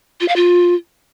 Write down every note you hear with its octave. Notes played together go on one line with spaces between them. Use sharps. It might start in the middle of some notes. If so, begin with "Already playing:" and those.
F4
F5
F4